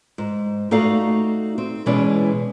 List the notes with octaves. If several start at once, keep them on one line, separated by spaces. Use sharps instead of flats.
G#2
A3 D#4 F#4 A4 D5 F5
C4
B2 E3 G#3 C#4 E4 D5